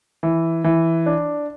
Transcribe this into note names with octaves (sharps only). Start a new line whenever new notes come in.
E3
E3
D4